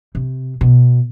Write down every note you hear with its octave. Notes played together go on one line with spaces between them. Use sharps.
C3
B2